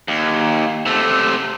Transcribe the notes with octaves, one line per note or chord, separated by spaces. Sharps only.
D#2
C3 A3